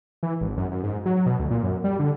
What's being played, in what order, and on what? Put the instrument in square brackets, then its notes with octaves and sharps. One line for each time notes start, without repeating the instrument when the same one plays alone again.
[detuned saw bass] E3
G#1
F#2
F#2
G#2
F#3
B2
D2
A#2
F#2
G3
D3